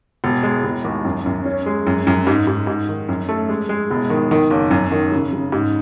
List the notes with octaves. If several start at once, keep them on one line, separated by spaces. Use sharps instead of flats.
E1
G#3
E1
D#2
F#2
F#2
C#4
G#3
F#2
F#2
G#2
G#2
G#2
D#3
F#2
A3
G#3
G#3
E1
D#3
D#3
F#1
F#2
D#3
C#3
C#3
G#2